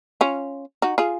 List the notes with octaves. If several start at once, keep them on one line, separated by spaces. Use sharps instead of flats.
C#4 F4
D#4 F#4
F4 G#4